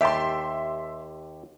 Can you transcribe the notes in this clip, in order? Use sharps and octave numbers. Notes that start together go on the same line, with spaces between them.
D#2 G4 E5 A5 C6